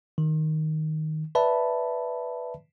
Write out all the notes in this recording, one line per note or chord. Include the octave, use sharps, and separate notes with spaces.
D#3
B4 D5 E5 A5 B5